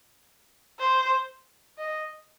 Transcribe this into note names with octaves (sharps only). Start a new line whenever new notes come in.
C5
D#5